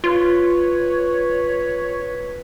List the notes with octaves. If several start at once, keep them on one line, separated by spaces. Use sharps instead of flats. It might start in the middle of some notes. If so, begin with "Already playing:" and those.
F4 B4 C#5